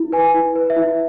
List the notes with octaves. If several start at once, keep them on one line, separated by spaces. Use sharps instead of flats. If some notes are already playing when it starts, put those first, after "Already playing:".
Already playing: E4
B4 G#5
E4
B4
E5
E4